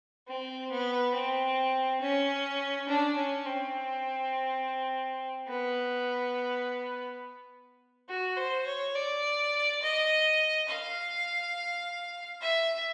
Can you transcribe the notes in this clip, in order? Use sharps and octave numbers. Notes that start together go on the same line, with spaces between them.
C4
B3
C4
C#4
D4
C#4
C4
B3
F#4
C5
C#5
D5
D#5
F5
E5